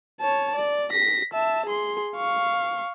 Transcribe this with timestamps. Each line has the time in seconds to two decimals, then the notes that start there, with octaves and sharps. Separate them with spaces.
0.20 C#5 A5
0.56 D5
0.91 A#6 B6
1.33 E5 A5
1.66 G#4 C6
2.16 F5 C#6